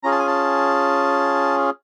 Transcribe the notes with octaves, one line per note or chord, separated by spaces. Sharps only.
C#4 F4 G#4 A#5
A5
G#5
A5